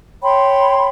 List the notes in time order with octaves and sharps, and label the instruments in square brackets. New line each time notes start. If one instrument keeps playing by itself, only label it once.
[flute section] C#5 G5 B5 C6